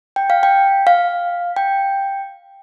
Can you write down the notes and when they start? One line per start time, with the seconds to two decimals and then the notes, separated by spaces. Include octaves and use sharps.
0.16 G5
0.30 F5
0.43 G5
0.87 F5
1.56 G5